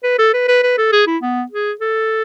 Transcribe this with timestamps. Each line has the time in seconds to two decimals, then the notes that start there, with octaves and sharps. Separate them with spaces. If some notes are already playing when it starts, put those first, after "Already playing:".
0.04 B4
0.19 A4
0.34 B4
0.48 B4
0.63 B4
0.78 A4
0.92 G#4
1.07 E4
1.22 B3
1.51 G#4
1.81 A4